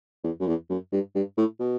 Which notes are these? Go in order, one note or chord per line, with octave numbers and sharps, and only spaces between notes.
E2
F#2
E2
F#2
G2
G2
A2
B2